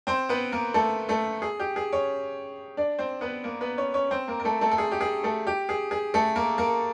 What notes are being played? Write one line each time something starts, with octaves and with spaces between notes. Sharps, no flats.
C4 C5
B3 B4
A#3 A#4
A3 A4
A3 A4
G#4
G4
G#4
C#4 C#5
D4 D5
C4 C5
B3 B4
A#3 A#4
B3 B4
C#4 C#5
C#4 C#5
C4 C5
A#3 A#4
A#4
A3 A4
A3 A4
A4
G#4
G4
G#4
A3 A4
G4
G#4
G#4
A3 A4
A#3 A#4
A#3 A#4